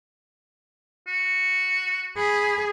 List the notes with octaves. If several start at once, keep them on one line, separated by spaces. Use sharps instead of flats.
F#4
G#4 B5